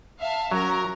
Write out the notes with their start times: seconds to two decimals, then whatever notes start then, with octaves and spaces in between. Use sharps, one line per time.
0.19 E5 F5 A5
0.51 F#3 C#4 A#4 A#5